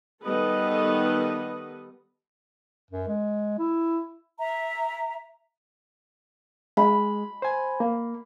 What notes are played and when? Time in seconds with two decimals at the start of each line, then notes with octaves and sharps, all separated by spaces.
0.24 D#3 G3 B3 A4 B4 D#5
2.90 F#2
3.08 G#3
3.59 E4
4.39 E5 A#5
6.77 G#3 B5
7.42 C5 G#5
7.80 A#3